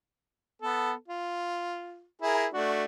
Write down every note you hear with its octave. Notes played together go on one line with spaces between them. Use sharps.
B3 A4
F4
E4 G#4 A#4
A3 D4 F#4